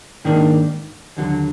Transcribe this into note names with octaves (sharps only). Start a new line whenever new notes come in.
G#2 D#3 A#3 D4
D#2 D3 F#3